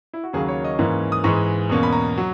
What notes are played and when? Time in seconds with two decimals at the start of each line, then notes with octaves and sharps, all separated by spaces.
0.13 E4
0.23 F#4
0.33 D#2 C#3 F#3 A#3 G#4
0.48 C#5
0.64 D#5
0.79 G#2 E3 A#3 C#4
1.12 D#6
1.24 G#2 E3 G#3 C#6
1.70 E2 B2 A#3 C#4
1.83 B5
1.92 A#5
2.18 F#3